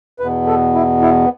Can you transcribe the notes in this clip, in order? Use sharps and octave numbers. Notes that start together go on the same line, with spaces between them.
E2 B2 B3 B4
A4
E4
E4